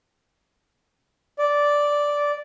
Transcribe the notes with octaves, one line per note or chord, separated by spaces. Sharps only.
D5